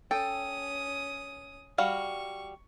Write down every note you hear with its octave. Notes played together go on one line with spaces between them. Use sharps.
C#4 A4 G5 D#6
G3 F#4 F5 C#6